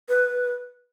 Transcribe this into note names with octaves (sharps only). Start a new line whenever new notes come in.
B4